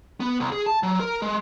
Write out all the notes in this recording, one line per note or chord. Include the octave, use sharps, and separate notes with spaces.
B3
C2
G#4
A5
F#3
A#4
G#3